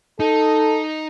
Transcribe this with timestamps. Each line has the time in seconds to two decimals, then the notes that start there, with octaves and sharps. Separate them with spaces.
0.20 D#4 A4